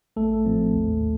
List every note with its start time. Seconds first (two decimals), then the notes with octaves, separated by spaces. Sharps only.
0.17 A1 A3 A4
0.45 A2 F3 C4
0.74 D#2